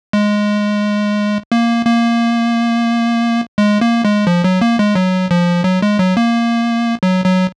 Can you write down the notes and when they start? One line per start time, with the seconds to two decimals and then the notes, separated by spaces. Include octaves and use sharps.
0.13 G#3
1.52 A#3
1.86 A#3
3.58 G#3
3.81 A#3
4.05 G#3
4.27 F3
4.44 F#3
4.61 A#3
4.79 G#3
4.95 F#3
5.31 F3
5.64 F#3
5.82 G#3
5.99 F#3
6.17 A#3
7.03 F#3
7.25 F#3